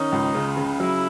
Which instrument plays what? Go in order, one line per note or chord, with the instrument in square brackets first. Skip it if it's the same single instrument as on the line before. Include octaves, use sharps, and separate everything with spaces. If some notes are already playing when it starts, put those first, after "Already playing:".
Already playing: [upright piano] D#3 C#4 [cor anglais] D#4
[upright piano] C#2
C#3
C#3
[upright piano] F#3 [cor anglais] E4